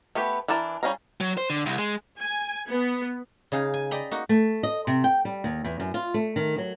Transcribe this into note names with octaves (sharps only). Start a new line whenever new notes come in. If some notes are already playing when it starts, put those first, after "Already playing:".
A3 B3 G4 B4
E3 D4 A#4 A5
G3 C#4 E4 F5 A#5
F#3
C5
D3
C2
G#3
G#5
B3
C#3 D#4 G#4 F5
G#5
D5 D#5 G5 A#5 B5
A#3 D#4 F#4
A3
D#5
C3
G5
G3
D#2
E2
F#2
F4
A3
D#3
F#3